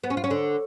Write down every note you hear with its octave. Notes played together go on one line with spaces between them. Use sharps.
B3
C#4
F4
C#4
D3